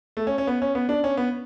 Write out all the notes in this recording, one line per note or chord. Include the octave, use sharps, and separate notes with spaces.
A3
C#4
C#4
B3
C#4
B3
D4
C#4
B3